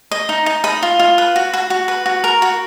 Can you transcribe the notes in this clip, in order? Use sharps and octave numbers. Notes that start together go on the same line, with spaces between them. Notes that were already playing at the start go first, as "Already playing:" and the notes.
D#5
D#4
D#4
D#5 B5
F4
F4
B4
F#4
F#4
F#4
B4
F#4
A#4
F#4